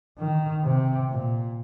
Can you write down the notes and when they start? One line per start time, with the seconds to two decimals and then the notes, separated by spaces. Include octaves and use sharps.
0.18 D#3
0.64 C3
1.10 A#2